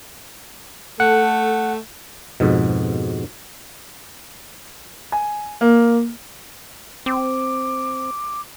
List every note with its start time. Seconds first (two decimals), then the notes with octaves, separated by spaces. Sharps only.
1.00 A3 A4 F#5
2.40 F2 G#2 B2
5.12 G#5
5.61 A#3
7.06 C4 D6